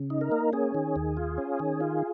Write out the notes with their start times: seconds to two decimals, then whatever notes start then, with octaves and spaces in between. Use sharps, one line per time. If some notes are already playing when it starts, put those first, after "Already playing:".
Already playing: C#3
0.10 D#4
0.21 A#4
0.32 A#3
0.53 C#4 G#4
0.74 D#3
0.96 D#2
1.17 F4
1.38 C#4
1.60 D#3
1.80 F4